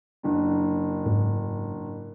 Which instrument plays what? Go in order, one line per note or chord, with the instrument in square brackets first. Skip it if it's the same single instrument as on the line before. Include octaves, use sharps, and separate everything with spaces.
[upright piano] F#1 D4
[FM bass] G#2